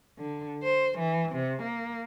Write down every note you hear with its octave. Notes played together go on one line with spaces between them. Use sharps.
D3
C5
E3
C3
A#3